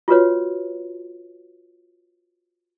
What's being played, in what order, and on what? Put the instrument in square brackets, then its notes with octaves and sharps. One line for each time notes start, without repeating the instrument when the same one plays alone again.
[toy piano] F4 F#4 B4 C#5